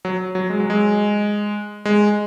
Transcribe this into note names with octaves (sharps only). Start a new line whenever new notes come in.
F#3
F#3
G#3
F#3
G#3
G#3